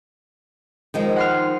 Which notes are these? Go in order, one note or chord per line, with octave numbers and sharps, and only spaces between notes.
D#3 F3 G#3
F#5 C6 F6